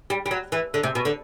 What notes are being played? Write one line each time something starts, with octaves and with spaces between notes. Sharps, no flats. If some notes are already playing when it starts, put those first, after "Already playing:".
G3
G3
F#3
E3
D3
C3
B2
D3